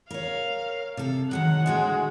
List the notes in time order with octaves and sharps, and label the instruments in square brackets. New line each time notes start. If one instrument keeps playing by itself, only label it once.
[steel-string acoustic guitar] A#4 C#5 [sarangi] F5
[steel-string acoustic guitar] C3 A4
[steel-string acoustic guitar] D#3 F#3 G#3 [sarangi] F#5
[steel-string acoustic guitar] A2 D3 F#4 [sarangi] G#3